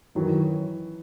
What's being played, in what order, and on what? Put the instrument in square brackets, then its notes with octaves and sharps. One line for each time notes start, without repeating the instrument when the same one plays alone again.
[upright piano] F#2 D#3 F#3 [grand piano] E3